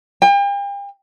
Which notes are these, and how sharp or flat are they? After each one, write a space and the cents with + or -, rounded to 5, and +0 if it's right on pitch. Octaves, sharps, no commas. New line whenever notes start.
G5 +40